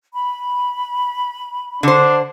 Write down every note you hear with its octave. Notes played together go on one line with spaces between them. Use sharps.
B5
D3 D4 C5